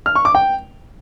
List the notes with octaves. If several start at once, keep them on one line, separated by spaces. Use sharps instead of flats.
F6
C#6
D6
G5